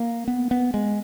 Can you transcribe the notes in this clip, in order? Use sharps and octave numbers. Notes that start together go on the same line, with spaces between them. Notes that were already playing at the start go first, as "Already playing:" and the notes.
Already playing: A#3
B3
B3
G#3